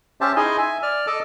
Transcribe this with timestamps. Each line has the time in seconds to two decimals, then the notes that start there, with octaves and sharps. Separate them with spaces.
0.21 C#4 G4 C5 E5 A5
0.36 D#4 E4 G#4 D#5 G#5 C6
0.58 E5 G#5
0.83 D5 F6
1.07 A4 D#5 A5 D6